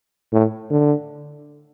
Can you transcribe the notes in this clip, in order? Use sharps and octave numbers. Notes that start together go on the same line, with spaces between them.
A2
D3